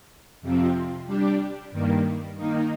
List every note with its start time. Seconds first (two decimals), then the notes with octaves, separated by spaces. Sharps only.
0.42 F2 C3 F3 C4
1.07 G3 D4 G4
1.72 G2 D#3 G3 A#3
2.37 D#3 A#3 D#4